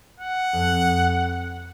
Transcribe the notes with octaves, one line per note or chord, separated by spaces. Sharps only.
F#5
F2